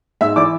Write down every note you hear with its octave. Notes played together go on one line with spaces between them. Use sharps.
G#2 E5 E6
E3 D5 D6